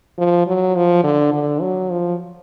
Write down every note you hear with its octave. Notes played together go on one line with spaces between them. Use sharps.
F3
F#3
F3
D3
D3
F#3
F3